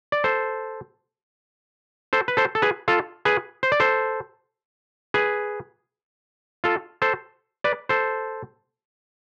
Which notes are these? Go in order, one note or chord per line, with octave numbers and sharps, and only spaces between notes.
D5
A4 C5
A4 C5
B4
A4 C5
A4
G#4 B4
F4 A4
G#4 B4
C5
D5
A4 C5
G#4 B4
F4 A4
A4 C5
B4 D5
A4 C5